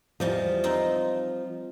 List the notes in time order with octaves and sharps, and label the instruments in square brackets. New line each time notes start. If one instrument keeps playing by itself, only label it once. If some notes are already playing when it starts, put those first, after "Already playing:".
[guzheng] E2 G3 D#5 [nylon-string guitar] F3
[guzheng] C4 D#4